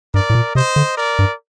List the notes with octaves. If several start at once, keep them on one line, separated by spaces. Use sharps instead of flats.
G2 A#4 D5
A2
A#2
C3 C5 D#5
D3
A#4 D5
G2